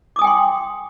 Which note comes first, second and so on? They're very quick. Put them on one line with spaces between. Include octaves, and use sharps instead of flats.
D6 D#6 G#5 G5 C6